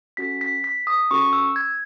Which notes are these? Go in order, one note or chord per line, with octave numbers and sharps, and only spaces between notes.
C#4 F#4 A4 B6
B6
B6
D#6
C#4 F#4 A4 C#6
E6
G#6